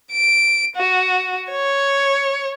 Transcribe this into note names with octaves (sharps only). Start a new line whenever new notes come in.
D7
F#4
C#5